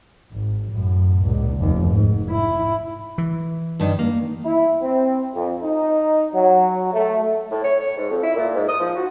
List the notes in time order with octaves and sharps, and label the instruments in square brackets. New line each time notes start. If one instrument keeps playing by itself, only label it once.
[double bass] G#1
F#2 A2
C#2 A#2
F1 D#2
G#2
E4
[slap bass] E3
[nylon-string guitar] G2 D#3
A#3
[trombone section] E4
C4
F2
D#4
F#3
A3
[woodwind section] A2
C#5
C#5
G#2
F2
E4
A#2
G#2
D#6
F3
F#4